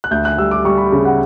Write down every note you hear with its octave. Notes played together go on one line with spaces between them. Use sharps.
F#6
D2 G6
F#6
G3 E6
D6
G3 C#6
B5
C#3
F#5